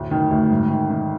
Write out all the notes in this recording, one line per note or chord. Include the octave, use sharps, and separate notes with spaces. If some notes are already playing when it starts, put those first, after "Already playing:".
Already playing: D2 A2
D#3
D2
G#2
D#3
D#3